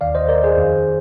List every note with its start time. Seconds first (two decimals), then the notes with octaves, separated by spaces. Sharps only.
0.01 D#2 D#3 D5 F5
0.15 C5 D#5
0.28 A#4 D5
0.44 G#4 C5
0.57 F2 D#3